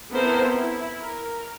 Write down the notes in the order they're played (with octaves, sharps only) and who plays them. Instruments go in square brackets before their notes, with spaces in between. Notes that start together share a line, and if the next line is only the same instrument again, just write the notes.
[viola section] B3 C4 E4 A4 A#4 C5
E4
A#4